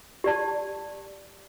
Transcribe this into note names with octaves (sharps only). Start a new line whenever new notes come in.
G4 D5 A5